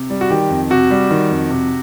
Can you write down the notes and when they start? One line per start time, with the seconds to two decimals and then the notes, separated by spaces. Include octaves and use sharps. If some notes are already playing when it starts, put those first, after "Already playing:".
Already playing: C3
0.10 G3
0.21 F#4
0.30 D#3 G4
0.50 F2
0.70 C3 F#4
0.90 G3
1.11 D#3
1.31 F2
1.50 C3